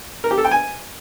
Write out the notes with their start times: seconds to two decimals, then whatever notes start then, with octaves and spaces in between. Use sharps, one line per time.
0.24 A#4
0.31 G4
0.38 A4
0.45 G5
0.51 G#5